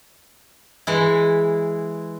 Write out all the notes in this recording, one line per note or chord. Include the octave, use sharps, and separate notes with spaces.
E3 G#3 E4